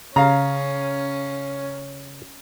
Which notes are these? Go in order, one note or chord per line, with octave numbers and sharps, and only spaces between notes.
C#3 C#4 F5 A#5